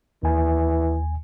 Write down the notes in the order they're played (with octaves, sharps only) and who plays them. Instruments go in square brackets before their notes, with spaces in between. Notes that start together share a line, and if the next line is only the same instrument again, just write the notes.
[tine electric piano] D#2 G#5 [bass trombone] E3